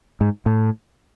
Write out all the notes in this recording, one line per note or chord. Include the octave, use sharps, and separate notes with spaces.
G#2
A2